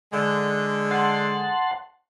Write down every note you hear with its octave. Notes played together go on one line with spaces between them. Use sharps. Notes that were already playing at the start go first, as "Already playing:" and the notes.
D3 G#3
F#5 A5 C6